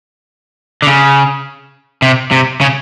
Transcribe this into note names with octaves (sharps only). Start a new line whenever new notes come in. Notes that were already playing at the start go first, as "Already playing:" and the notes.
D3
C#3
C3
C3
C#3